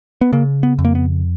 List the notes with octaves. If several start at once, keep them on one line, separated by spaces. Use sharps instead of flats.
B3
C#3 A#3
B3
F2
A#3
B3